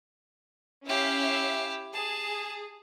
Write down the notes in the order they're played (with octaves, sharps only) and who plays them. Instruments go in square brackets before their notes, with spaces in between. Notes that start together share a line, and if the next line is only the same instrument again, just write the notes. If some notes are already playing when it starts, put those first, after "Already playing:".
[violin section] C#4 E5 F5 [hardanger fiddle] E4 G4
[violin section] G#4 [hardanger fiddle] A5